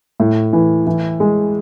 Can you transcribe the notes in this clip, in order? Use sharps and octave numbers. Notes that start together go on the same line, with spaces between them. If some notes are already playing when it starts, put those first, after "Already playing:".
A2
E3
E3
G#3